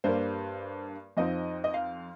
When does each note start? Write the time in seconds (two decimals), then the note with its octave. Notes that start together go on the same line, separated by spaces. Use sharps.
0.04 G2 G3 A#3 C5
1.17 F2 F3 C4 D#4 D#5
1.64 D#5
1.74 F5